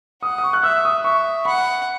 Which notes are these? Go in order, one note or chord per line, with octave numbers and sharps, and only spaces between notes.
F#5 D#6
D#6
C#6
F#6
E5 E6
D#6
E5 C#6
F#5 B5